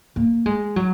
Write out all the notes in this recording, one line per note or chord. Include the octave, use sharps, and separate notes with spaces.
A#3
G#3
F#3